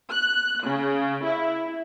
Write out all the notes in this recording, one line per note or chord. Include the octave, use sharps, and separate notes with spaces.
F#6
C#3
E4